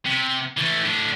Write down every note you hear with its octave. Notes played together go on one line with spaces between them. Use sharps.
C3
E3 A3
A2 D4